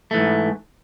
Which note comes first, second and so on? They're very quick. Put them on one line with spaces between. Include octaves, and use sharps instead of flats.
A3 E3 G#2